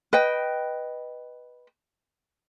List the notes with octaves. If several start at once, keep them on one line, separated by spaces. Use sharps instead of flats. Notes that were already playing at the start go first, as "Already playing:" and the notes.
B4 D#5 G5